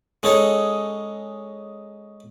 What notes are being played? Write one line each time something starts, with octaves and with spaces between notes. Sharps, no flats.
G#3 C#4 D#4 G#4 A4